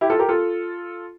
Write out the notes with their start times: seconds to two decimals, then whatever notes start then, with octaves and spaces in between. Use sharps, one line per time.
0.01 E4 G4
0.10 F4 A4
0.19 G4 A#4
0.29 F4 A4